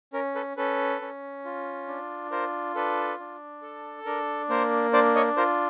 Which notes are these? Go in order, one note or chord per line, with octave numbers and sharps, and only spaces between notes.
C#4 A#4
A4 B4
C#4 A4 B4
C#4
F4
D4
F4 A#4 C5
D4 A4 B4
D4
A4
D4 A#4
A#3 A#4 C5
D4 C5 D5
C#5 D#5
F4 A#4 C5